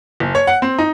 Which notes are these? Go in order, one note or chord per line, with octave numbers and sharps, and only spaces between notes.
F#1
C#5
F#5
C4
D#4